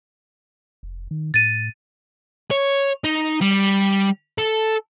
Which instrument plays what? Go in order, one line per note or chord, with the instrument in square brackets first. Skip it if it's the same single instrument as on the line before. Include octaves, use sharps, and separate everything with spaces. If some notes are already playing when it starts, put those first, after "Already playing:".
[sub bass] F1
D#3
[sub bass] A2 [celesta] A6 D#7
[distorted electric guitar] C#5
D#4
G3
A4